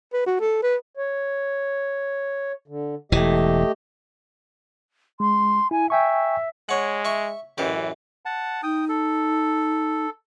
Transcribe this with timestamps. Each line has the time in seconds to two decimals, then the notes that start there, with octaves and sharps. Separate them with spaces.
0.13 B4
0.26 F#4
0.41 A4
0.63 B4
0.97 C#5
2.68 D3
3.12 E1 E3 A3 G4 D#5
5.20 G#3 C6
5.71 E4 G#5
5.90 E5 G5 G#5 C#6
6.69 G#3 C#5 F#5
7.05 E5 C#6
7.58 A1 F#2 E3 G4
8.25 F#5 A5
8.63 D#4 G5 D#6
8.89 A4